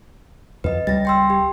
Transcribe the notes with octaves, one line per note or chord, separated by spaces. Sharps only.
F2 B4 D#5
C#2 G3 A6 A#6
G5 C6 E6
G4